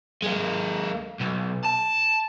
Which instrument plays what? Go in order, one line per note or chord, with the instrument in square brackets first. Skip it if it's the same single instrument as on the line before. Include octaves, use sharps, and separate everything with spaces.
[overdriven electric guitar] G#3 A#3
B1
A5